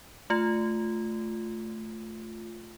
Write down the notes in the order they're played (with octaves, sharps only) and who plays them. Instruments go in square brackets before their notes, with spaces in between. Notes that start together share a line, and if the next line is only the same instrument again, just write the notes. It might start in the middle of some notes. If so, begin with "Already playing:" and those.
[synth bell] A3 F4